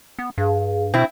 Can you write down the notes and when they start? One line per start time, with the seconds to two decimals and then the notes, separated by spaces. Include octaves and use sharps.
0.19 B3
0.38 G2 G#4 F5
0.94 B2 C4 E4